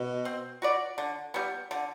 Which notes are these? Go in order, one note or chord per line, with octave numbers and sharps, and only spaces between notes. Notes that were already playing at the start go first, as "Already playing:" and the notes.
Already playing: B2
C4
F#4 B4 D5
D3
G3 B3
D3